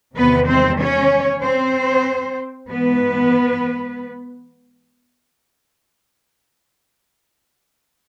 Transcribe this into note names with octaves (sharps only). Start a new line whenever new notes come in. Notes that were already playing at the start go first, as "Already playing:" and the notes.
E2 C3 D#3 G#3 B3 B4
C4 C5
C#4 C#5
C4 C5
G#2 E3 G#3 B3 B4